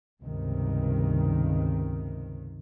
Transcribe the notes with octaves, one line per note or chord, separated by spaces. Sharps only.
C#2 G2 C3 D#3